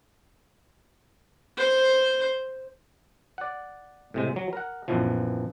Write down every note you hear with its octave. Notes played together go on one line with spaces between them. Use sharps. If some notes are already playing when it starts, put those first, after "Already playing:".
C5
D5 F#5
A2 C3 G#3
F#3
A#4 F#5
A#1 F#2 B2 E3 F3